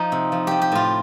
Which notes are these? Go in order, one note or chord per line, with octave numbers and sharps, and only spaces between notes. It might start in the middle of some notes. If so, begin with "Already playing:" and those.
Already playing: F3 D#4
C3
F3
F3 G4
G4
A2 F4